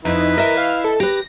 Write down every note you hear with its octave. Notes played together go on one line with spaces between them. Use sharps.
F2 D#4 E4 B4
A#4 D#5 E5
F5
A4
G4 B4 A#6